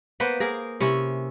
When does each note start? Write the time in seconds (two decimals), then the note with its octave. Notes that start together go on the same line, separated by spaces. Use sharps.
0.20 A#3 B3 B4 C5
0.40 A#3 G#4 A#4
0.80 C3 C#4 E4